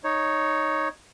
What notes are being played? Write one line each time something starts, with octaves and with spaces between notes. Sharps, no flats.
D#4 C#5